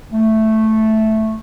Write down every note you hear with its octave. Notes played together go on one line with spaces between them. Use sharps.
A3